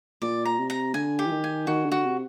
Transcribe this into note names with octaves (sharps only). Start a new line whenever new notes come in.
A#2 D5
A#5
C3
A#5
D3 G#5
G4
E3
D#3
G#5
D#3 F#4
D3
F#4
C3